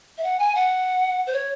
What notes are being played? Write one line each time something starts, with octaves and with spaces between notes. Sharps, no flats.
E5
F#5
G#5
F#5
C5
C#5